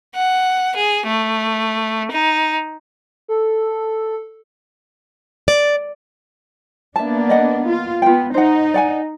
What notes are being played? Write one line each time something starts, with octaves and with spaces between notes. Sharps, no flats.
F#5
G#4
A3
D#4
A4
D5
A#3 B3 D4 E5 A5
D5 D#5 F#5
F4
B3 F4 G5
D#4 C5 F#5
D5 F#5 G#5